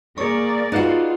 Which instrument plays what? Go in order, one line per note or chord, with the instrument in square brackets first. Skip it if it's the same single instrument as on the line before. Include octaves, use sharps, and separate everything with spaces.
[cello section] A#3 A#4 D5 [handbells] G#4 C#6
[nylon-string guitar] D#4 F#4 [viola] F4 [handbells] G#4 B4 F5